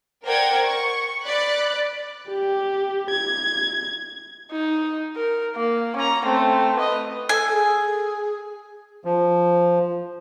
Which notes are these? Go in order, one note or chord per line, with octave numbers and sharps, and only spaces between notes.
A#4 C5 D5 F#5 G5 G#6
C#6
D5 B5 F#6
G4
G#6
D#4
A#4
A#3
C#4 A#5
A3 C4
B4 D#5
A4 G#5
G#4
F3